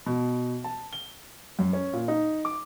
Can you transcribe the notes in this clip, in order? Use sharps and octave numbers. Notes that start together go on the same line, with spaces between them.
B2
A5
G7
F#2
C#4
A#2
D#4
D6